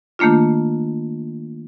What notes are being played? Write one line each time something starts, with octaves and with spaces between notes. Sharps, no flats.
D#3 A3 A#3 D4 F4